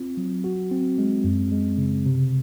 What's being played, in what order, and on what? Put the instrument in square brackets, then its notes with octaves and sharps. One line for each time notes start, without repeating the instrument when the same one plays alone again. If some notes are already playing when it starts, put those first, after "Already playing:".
Already playing: [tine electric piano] C4 F4
F#3
F#4
C4
G#3
F#2
G#3
C#3
C3